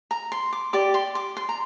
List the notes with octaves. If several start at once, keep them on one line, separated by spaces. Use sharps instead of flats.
A#5
C6
D6
G4 D5 D6
C6
D6
C6
A#5